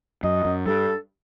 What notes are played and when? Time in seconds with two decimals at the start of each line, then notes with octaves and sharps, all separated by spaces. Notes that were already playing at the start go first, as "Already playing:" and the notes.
0.23 F#2 D#5
0.45 F#2
0.66 G2 A4